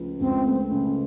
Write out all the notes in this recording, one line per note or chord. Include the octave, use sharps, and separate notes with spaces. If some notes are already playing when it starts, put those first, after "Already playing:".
Already playing: C#2 C#3 F3 A3
C#2 C4
A3
C#3